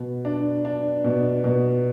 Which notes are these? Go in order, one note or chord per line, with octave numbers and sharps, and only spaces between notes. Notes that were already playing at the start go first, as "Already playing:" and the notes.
Already playing: B2
D4
D4
B2
B2